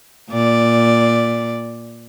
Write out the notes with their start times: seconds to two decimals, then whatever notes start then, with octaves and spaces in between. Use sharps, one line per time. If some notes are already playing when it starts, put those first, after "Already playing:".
0.30 A#2 D5